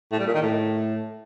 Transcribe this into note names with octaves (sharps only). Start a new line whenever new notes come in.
A2
G3
A#2
D#3
A2